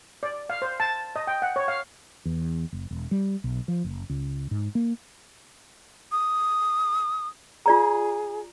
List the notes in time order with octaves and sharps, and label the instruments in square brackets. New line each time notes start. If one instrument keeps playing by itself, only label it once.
[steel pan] D5
F5
C5
A5
D#5
G5
F#5
C#5
F5
[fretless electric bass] E2
F#1
E1
G3
B1
F3
F#1
C#2
G#2
A#3
[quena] D#6
[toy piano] F4 D5 A#5 [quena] G#4